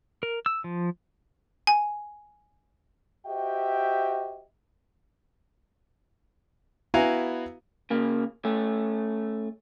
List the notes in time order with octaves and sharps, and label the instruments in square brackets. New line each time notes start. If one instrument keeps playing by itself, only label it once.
[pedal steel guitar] A#4
E6
F3
[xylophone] G#5
[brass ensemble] F#4 G4 C5 D#5 E5 G5
[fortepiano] B3 E4 F#4 F5 G#5 A#5
[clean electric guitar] C#3 A#3
A3 C#4